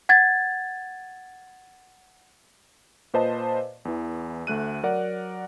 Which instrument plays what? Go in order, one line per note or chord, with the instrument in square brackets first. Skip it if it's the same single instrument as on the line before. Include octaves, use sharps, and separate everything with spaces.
[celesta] F#5 G#6 A6
[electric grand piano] A#2 B4 C5 D#5 A5
E2 E3
D2 A3 F#6 D#7
F#3 A#4 D5 F#5